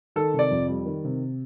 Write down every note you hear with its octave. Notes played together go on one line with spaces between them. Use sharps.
D#3 A4
C3
D5
F2
G3
D#3
C3